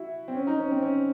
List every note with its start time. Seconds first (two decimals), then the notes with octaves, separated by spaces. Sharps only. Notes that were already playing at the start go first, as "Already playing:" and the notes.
Already playing: E4 F#4
0.28 C4
0.35 C#4
0.47 D#4
0.59 C#4
0.71 C4
0.83 C#4